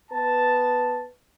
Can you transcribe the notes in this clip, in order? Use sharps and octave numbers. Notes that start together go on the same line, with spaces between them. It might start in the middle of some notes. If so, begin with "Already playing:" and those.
B3 B4 A5